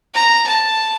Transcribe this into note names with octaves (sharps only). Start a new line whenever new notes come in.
A#5
A5